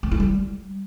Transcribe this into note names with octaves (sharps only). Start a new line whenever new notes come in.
C4
E4
G3